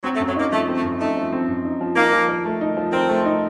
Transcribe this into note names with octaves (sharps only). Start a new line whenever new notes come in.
F#3 C4
A3
F#2
F#3
A#3 D#4
F3 A3
C4
A3
F#2
A3 D#4
F3
C4
F#2
D#4
F3
A#3 D#4
F3
A#4
A3
D#4
F3
C4 A#4
A3
D#4